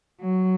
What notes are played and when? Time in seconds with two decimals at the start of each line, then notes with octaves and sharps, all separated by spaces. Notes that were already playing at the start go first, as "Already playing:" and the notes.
0.21 F#3